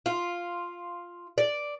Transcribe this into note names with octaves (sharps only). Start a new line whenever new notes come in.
F4
D5